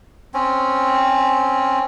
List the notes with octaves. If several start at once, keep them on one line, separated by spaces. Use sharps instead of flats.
C4 C#4